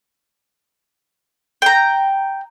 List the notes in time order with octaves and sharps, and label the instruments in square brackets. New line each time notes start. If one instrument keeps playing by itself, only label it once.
[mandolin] G5 A#5